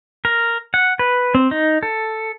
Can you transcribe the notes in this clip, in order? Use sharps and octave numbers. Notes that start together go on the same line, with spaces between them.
A#4
F#5
B4
C4
D#4
A4